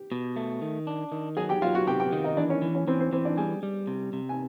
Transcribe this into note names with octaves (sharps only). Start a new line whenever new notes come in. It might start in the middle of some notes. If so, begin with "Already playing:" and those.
Already playing: G4
B2
A3
D#3
D4
D#3
F#3 G#4 G#5
G4 G5
F#3 F4 F5
F#4 F#5
C3 G4 G5
G4 G5
D#3
D#4 D#5
E3 D4 D5
C#4 C#5
E3
C#4 C#5
E3 C4 C5
C4 C5
E3 C4 C5
D4 D5
G3 G#4 G#5
G3
C3
C3
G#5